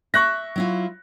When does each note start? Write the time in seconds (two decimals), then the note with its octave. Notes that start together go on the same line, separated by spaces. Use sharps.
0.14 E5 C#6 F#6 A#6
0.56 F#3 E4 F4